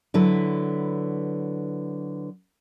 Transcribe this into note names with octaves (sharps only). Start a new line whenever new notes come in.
D3 F#3 E4 B4